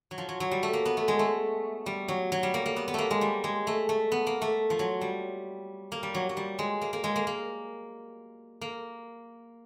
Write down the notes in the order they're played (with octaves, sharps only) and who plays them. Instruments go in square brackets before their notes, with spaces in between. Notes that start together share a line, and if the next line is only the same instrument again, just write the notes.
[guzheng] F#3
F3
F#3
F#3
G3
A3
A#3
B3
A3
G#3
A3
G3
F#3
F#3
G3
A#3
A#3
B3
B3
A3 A#3
G#3
G3
G#3
A3
A3
B3
A#3
A3
F3
F#3
G3
A#3
G3
F#3
F#3
G3
G#3
A#3
A#3
G#3
A#3
A#3
A#3